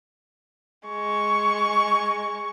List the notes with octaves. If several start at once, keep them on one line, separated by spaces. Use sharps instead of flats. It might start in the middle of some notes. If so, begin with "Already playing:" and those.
G#3 C#6